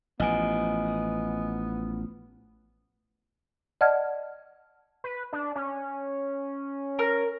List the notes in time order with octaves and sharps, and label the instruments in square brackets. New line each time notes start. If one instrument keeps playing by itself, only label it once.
[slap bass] A1 F3 [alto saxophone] B3 [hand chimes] D#5 G#5 D7
[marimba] D5 D#5 F#5 A5 F6 G#6
[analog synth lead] B4
D4
C#4
[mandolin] A#4 F6